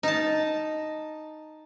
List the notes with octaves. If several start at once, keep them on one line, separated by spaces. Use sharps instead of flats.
D#4 A5